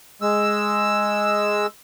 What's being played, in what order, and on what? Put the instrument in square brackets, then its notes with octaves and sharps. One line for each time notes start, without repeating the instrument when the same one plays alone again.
[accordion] G#3 E6